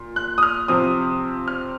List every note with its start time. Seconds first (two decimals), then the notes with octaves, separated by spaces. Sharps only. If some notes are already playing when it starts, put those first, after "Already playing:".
Already playing: A#2
0.16 F#6
0.38 D#6
0.43 F6
0.68 C3 F3 C4 D#6
1.48 F6